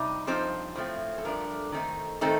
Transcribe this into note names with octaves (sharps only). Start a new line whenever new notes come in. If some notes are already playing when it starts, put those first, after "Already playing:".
Already playing: C3 G3 D#4
G2 F3 C4 D#4 C5
A2 F3 A3 C4
A4
G2 F3 A3 D4 A#4
D#3 A3 C4 D#4
D#3 A3 C4 D#4 A4